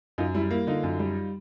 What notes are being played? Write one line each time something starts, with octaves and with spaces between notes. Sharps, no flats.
F#2 D#4 F4
G3 E4
A#3 E4
D3 D#4 F4
F#2
G3